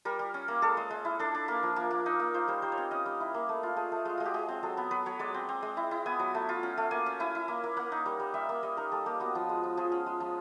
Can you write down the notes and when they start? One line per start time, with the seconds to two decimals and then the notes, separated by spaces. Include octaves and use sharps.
0.05 G3 A#4
0.19 G3
0.34 C#4
0.48 A#3
0.62 G#3 A4
0.77 G#3
0.91 G#3
1.05 E4
1.19 D4 A4
1.35 D4
1.48 A#3 A#4
1.63 F3
1.76 A#3
1.91 A#3
2.06 D#4
2.20 A#3
2.34 F4 C5
2.48 G3 C5
2.62 G3 C5
2.72 C#5
2.77 C4
2.91 C#4 D#5
3.06 G3
3.20 E4
3.34 A#3
3.49 A3
3.63 F4
3.76 A3 G#4
3.92 A3
4.05 G#3 F4
4.18 G#3 F#4
4.25 G4
4.34 G#3 G#4
4.49 C4
4.63 F#3 A4
4.77 B3
4.91 F#3 B4
5.06 F#3 C#5
5.19 G#3 D5
5.34 C4
5.49 C4
5.62 G#3
5.77 E4
5.91 E4
6.06 B3 G#5
6.19 F#3
6.35 A3
6.49 F4
6.63 C#4
6.78 A3
6.91 A#3 G#5
7.06 C#4
7.20 E4 G#5
7.35 E4
7.48 A#3
7.64 A#3
7.77 A#3 F#5
7.92 D#4
8.06 G3
8.20 G3
8.34 G3 E5
8.49 A#3
8.63 G3 D#5
8.77 D#4 A#4
8.92 G3 A4
9.06 A#3 G4
9.20 B3 F#4
9.35 F3
9.49 G#3
9.63 F3
9.77 F3 G#4
9.92 C#4
10.06 G#3
10.20 F3